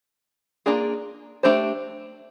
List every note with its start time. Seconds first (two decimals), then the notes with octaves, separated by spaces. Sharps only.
0.66 A#3 D4 F4 G#4
1.43 A3 D4 G4 C5